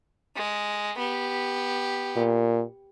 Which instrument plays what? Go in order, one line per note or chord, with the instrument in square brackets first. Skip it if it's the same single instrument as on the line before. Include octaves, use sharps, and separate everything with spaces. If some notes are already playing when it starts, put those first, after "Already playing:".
[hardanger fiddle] G#3
B3 G4
[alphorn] A#2